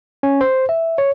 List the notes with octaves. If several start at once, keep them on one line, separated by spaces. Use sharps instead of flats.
C#4
C5
E5
C#5